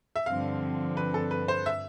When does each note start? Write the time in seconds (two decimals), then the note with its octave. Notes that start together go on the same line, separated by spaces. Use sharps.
0.16 E5
0.26 G2 D3 F3 C4 F5
0.97 B4
1.14 A4
1.31 B4
1.48 C5
1.66 E5